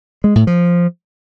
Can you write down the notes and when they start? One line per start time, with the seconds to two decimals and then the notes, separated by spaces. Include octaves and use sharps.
0.24 G#3
0.36 A2
0.47 F3